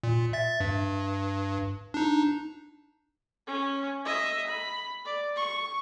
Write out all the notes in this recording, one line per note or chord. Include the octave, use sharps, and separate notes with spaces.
A#2
E5 A6
G2
D4 D#4
C#4
D#5 E5
B5
D5
C#6